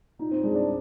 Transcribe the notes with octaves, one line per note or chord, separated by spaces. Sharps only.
A#2 D#4
C4
G#3 D4
D4